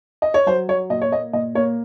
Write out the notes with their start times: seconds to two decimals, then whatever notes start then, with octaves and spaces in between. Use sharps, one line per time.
0.22 D#5
0.34 C#5
0.46 F#3 C5
0.68 F#3 C#5
0.90 A#2 D#5
1.02 C#5
1.12 A#3 D#5
1.33 A#2 D#5
1.55 A#3 C#5